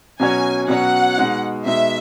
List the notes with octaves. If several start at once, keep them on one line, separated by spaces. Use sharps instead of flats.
B2 F#3 C#4 F#4 C#5 G#5
B2 F#3 C#4 F#4 C#5 F#5
B2 G#3 D#4
B2 G#3 D#4 E5